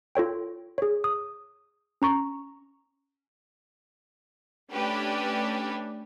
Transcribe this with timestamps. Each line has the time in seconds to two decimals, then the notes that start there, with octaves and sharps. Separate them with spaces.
0.15 F4 A4 C#5 G5
0.78 G#4 C#5
1.04 D#6
2.02 C#4 A#5 C#6
4.71 A3 C#4 D4 G4 B4